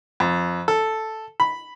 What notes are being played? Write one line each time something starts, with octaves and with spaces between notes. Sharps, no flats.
F2
A4
B5